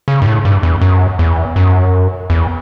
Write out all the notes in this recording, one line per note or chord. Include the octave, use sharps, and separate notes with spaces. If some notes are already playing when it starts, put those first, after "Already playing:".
C#3
G2
A2
G2
E2
F#2
E2
F#2
E2